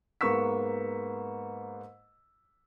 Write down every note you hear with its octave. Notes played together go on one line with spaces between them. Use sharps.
G#2 A#3 B3 C#6 E6 B6